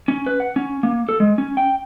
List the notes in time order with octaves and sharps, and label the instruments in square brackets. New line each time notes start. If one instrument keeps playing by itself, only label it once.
[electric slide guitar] C#4
B4
F#5
C#4
A#3
A4
G#3
C#4
G5